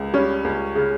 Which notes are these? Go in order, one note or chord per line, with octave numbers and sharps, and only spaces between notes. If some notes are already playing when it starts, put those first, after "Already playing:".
Already playing: C#2
G3 C#4
C#2
C#3